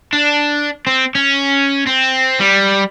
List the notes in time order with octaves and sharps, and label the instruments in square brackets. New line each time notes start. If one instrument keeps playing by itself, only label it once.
[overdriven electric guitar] D4
C4
C#4
C4
G3